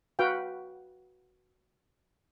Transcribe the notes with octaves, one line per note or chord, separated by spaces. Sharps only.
F#4 B4 F5 G5